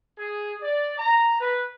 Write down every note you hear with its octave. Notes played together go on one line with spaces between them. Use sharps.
G#4
D5
A#5
B4